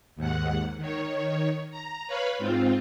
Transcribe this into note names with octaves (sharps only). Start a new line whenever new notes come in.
D#2 G#2 F#5
D#3 C#5
A#5
B4 C#5 F5 B5
G#2 C4 F4